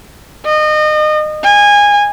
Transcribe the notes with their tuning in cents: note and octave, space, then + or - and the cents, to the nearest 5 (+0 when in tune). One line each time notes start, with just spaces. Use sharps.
D#5 -30
G#5 -20